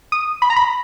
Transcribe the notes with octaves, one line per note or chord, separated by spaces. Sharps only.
D#6
B5
A#5
B5